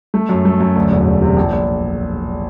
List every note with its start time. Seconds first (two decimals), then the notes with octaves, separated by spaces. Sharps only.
0.14 A3
0.29 F#2
0.45 A3
0.60 F#2
0.76 D2
0.91 E1
1.06 E1
1.21 C3
1.36 A#1
1.52 A#1